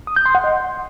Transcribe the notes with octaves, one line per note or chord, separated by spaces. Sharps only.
D#6
G6
C6
F#5
D#5